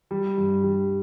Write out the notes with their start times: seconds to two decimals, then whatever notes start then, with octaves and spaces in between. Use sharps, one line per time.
0.11 G3
0.37 G2
0.63 G3